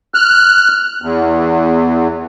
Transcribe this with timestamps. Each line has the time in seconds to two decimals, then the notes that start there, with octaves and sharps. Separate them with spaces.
0.14 F6 F#6
1.02 E2